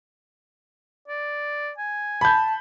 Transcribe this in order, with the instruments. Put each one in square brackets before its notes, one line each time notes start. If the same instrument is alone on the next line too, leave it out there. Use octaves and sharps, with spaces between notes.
[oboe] D5
G#5
[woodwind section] A5 [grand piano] B5 G6